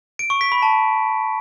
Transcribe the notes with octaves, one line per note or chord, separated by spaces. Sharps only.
D7
C#6
B6
B5
A5